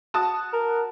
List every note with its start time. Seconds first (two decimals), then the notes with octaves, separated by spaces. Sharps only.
0.14 F#4 A5 D#6
0.53 A#4